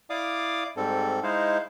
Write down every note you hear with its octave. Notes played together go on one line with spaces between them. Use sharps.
E4 D5 F5 D6 D#6
G#2 G3 C4 A4
G#3 D#4 E4 C5 F5